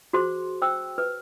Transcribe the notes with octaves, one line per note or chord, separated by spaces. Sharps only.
F#4 G#4 C5 C6
C5 G5 E6
B4